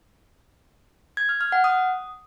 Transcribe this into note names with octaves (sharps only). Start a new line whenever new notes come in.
G#6
F6
F6
F#5
D#6